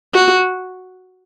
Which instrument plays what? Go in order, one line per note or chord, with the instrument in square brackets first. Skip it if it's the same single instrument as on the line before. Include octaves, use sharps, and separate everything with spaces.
[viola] F#4